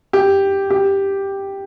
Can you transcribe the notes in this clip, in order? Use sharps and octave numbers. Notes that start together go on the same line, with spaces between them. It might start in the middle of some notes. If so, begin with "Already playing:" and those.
G4
G4